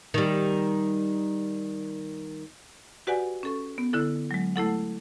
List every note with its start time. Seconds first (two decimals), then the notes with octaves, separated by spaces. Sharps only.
0.14 D#3 G3
3.07 F#4 G4 B4 D5 F#5 G#5
3.43 C#4 A4 C#6
3.78 B3
3.93 D3 E4 A4
4.31 F#3 G#3
4.56 A3 E4 A4 F#5